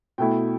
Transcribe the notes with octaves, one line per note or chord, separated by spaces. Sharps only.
B2 A3 E4 G5